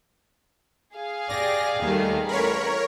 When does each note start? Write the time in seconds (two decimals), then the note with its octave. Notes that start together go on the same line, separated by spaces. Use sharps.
0.96 G#4 F5
1.30 G4 D5 A#6
1.82 D#2 D#3 G3 A3
2.29 A1 A#4 C#5 B5